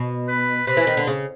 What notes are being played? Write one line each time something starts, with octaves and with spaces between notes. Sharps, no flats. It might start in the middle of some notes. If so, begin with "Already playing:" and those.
Already playing: B2
B4
C3 B4
E3
D#3
D3
C#3